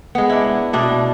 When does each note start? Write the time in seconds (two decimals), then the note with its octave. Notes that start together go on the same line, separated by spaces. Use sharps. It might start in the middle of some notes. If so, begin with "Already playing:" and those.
0.15 G#3 B3
0.30 D4 E4
0.73 B2 D4 E4